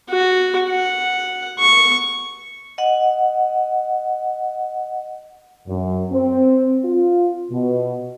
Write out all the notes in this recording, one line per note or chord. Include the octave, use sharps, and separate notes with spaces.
F#4
F#5
C#6
D#5 F#5
F#2
C4
F4
B2